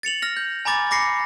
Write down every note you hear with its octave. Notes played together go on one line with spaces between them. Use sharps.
A6 C#7 F7 F#7
F6 A#6
G6
G#5 A#5 B5 D6 A6
B5 D6 A#6 C7 C#7